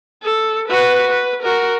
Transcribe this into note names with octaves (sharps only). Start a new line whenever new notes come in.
A4
F#4 B4
B4
F#4 A#4